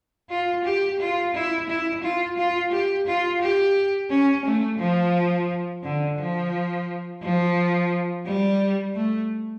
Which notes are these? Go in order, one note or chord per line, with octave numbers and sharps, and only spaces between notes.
F4
G4
F4
E4
E4
F4
F4
G4
F4
G4
C#4
A3
F3
D3
F3
F3
G3
A3